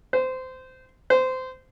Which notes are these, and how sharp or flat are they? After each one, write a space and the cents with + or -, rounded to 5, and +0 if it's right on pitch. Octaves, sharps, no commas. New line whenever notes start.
C5 -20
C5 -20